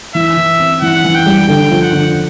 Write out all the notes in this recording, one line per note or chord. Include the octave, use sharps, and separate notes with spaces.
E3 E5
E3
C4
E3 F#5
E3
G5
G3
D3 G5
F3
F#5
D3